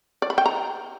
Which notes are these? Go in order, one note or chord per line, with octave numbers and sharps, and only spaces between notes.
D5
B5
G5
A#5